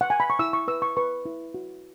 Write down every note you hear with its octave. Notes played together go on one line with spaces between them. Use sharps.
F#5
G#5
B5
C#6
E4 E6
C#6
B4 E6
C#6
B4 C#6
E4
F#4